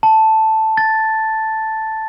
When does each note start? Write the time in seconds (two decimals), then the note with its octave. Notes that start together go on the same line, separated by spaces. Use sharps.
0.03 A5
0.77 A6